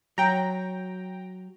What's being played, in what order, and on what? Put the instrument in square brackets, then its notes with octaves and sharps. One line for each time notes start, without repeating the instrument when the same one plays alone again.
[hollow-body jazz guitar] F#3 [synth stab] G5 A#5